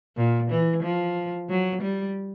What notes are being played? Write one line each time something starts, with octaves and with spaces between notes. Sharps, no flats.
A#2
E3
F3
F#3
G3